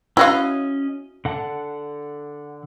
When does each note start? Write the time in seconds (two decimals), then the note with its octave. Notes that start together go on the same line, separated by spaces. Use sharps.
0.17 C#4 E4 F#4 D#5 F5
1.25 D3 F#5 A5